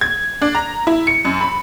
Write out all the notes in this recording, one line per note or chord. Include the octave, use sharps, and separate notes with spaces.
G#6
D4
A#5
E4
C#7
F#2
B5